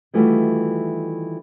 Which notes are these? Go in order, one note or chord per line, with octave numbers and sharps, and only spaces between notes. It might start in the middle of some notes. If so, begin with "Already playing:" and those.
D#3 E3 G3 A3 F4 F#4